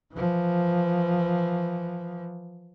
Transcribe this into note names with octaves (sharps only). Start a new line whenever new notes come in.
E3 F3